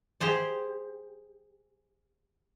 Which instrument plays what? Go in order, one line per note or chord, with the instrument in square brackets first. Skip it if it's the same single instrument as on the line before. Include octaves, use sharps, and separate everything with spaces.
[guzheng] G4 G#4 C5 D5